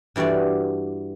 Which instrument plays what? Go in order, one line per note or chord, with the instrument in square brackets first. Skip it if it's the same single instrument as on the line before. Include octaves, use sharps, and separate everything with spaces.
[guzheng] G2 E3 G3 F#4 D5